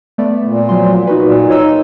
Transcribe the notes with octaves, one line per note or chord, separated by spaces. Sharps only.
A3 B3 D5
A#2
F3 F#3 C6
D#4 F#4 B4
A#2
D#4 C#5 E6